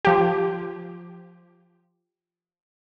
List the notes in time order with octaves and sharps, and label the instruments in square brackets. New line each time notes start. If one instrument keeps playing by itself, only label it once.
[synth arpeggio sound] F3 G4